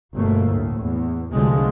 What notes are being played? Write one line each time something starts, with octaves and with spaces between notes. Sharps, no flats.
G1 B2 A3 A#3
D2 A2
E2
C2 B2 D3 F3 G#3 A3